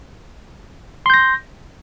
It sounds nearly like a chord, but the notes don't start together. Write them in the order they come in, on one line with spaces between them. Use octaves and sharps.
C6 G6 A#6